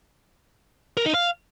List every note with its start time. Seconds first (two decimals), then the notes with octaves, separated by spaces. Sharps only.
0.97 A#4
1.06 D#4
1.14 F5